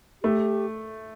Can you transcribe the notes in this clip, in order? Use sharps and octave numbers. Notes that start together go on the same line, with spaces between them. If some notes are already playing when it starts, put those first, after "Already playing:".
A3 G4